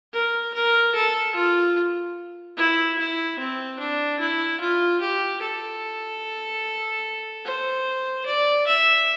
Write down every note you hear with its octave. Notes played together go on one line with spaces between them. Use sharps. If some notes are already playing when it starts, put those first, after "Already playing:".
A#4
A#4
A4
F4
E4
E4
C4
D4
E4
F4
G4
A4
C5
D5
E5